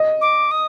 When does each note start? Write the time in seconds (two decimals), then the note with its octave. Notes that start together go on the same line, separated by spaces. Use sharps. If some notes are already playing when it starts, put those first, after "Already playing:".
Already playing: D#5
0.21 D6
0.51 D#6